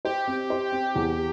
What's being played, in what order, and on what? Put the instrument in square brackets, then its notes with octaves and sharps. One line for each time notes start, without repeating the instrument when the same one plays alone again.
[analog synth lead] G4 [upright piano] C5
[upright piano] C4
C5
C4
E2